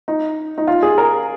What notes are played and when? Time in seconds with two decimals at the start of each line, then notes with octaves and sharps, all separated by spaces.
0.08 D#4
0.58 D#4
0.67 F4
0.83 G#4
0.98 A#4